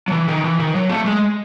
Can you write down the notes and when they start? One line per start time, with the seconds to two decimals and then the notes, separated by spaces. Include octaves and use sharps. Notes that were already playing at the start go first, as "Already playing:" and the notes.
0.08 F#3
0.11 E3
0.28 D#3
0.44 E3
0.59 D#3
0.75 F#3
0.89 A3
1.06 G#3